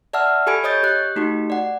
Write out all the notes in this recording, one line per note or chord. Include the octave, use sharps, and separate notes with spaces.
D5 E5 F#5 A5 E6 F6
G4 A4 G#5 B5 G#6 D7
C#5 D#5 D#6 G6 A6
G4 F#6
A3 D#4 F#4 G4
D5 F#5